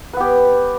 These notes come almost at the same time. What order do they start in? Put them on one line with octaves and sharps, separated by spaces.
B4 B3 G4